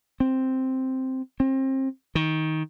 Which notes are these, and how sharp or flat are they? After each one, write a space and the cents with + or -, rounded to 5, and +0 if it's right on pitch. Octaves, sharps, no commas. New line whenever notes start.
C4 +0
C4 +30
D#3 +15